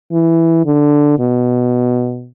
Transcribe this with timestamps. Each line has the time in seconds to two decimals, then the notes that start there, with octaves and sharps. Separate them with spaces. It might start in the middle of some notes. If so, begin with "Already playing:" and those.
0.12 E3
0.66 D3
1.19 B2